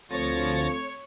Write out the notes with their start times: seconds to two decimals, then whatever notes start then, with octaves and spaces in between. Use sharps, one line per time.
0.11 D2 F3 A3 C4 A4 C#5 A6 A#6